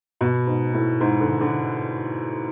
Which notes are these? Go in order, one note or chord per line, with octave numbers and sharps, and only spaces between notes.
B2
G#2
A2
G#2
D3
D3